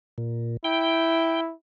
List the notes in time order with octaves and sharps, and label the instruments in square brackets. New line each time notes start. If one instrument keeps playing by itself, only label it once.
[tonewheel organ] A#2
[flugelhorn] E4 [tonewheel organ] G5